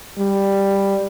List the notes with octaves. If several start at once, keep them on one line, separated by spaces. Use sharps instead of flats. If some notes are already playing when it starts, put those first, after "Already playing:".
G3